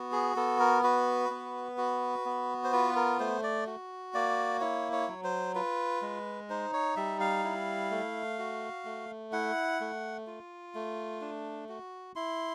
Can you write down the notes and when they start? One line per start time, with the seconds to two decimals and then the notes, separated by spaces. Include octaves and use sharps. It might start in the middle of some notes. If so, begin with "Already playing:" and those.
Already playing: B3 F#4
0.12 G#4
0.36 B3 A4
0.60 A#4
0.84 F#4 B4
1.31 B3
1.78 F#4
2.25 B3
2.64 C5
2.72 F4 B4
2.96 A#4
3.19 A3 C5
3.43 D5
3.67 F#4
4.14 A#3 D5
4.61 E4 C#5
4.92 C#5
5.08 F#3
5.24 C5
5.55 F4 B4
6.02 G#3
6.50 D#4 C5
6.73 C#5
6.96 G3 E5
7.20 F5
7.44 E4
7.91 A3
8.39 F#4
8.85 A3
9.32 E4 F#5
9.80 A3
10.27 F4
10.75 A3
11.21 D4
11.69 F#4
12.16 E4 C6